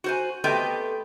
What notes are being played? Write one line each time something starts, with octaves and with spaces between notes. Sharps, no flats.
F#4 C5 G#5
A3 B3 C4 G4 D#5 G5